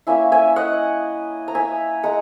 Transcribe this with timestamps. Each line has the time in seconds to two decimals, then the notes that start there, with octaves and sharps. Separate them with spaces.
0.07 A#3 C#4 E4 E5 G#5
0.32 E5 G#5
0.56 D#5 F#5
1.48 A#5
1.55 E5 G#5
2.03 G#3 F#5 A#5